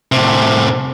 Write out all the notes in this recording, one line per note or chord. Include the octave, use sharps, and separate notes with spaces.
A2 C3